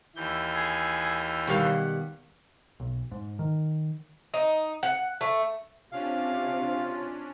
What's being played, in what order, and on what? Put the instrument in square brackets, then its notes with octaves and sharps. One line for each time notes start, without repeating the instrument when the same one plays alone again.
[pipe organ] D#2 E3 G6
[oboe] G#4
[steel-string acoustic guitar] B2 G3 [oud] D#3 F5 [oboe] F#5
[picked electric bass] B1
G#2
D#3
[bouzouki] D#4
F#5
A3
[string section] C3 [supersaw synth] C#4 D4 [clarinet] F4 [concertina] F5